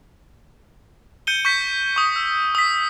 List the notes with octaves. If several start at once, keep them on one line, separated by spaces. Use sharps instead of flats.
G6 C#7 D#7 G7
C#6 G6 B6
C#6 D#6
E6
D#6 B6